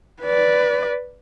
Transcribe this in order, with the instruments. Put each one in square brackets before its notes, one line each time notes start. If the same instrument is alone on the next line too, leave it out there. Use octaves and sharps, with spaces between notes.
[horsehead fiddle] B4 D5